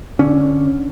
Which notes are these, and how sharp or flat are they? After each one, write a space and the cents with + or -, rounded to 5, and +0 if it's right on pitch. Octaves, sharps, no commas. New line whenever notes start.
D3 +0 C#4 +0